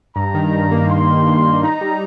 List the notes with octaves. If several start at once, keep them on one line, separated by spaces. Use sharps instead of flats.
G2 A#5
D#3
G2
A#3
G2 C6
D#3
G2
A#3
D#4 A#5
G3